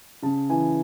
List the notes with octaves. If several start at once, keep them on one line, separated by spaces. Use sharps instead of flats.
C#3 A5
E3 G#5